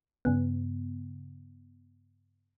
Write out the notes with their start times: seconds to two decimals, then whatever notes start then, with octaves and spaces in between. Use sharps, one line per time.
0.25 G2 C#3 B3